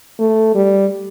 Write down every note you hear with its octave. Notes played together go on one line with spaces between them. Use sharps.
A3
G3